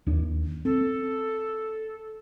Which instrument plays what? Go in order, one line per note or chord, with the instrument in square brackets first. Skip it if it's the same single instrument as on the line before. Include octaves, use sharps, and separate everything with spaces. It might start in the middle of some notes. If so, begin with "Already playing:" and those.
[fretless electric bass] D#2 D4
[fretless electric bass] C4 [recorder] A4